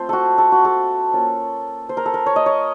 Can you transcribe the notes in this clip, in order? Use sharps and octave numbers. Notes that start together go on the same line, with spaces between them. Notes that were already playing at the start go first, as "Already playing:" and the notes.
Already playing: A3 C4 F4 C5
F#4 A4
A4
F#4
A4
A#3 C#4 F4
C5
A#4
A4
A#4
C#5
D#5
C#5